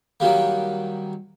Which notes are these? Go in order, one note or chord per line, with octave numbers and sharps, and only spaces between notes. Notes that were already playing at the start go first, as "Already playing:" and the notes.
D#3 F#3 G3 A#3